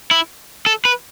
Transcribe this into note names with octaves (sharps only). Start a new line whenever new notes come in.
E4
A4
B4